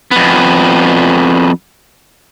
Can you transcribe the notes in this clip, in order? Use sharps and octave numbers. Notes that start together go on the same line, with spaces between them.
F2 B3